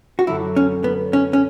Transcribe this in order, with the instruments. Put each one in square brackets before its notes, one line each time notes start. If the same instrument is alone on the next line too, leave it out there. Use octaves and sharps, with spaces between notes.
[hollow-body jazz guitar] F#4
[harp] F#2 D3 F#3 [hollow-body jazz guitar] E4
[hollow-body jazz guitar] C#4
B3
C#4
C#4